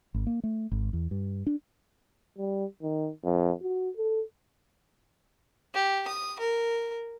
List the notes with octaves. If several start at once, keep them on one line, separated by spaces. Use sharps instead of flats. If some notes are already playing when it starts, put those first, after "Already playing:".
G#1
A#3
A3
G#1
E2
G2
D4
G3
D#3
F2
F#4
A4
G4
D#6
A#4